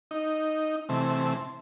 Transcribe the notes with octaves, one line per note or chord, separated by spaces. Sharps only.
D#4
C3 E3 A3 C4